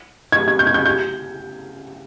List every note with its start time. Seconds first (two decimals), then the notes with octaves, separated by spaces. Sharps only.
0.32 G#6
0.48 G#6
0.59 G6
0.67 G#6
0.74 G6
0.85 G6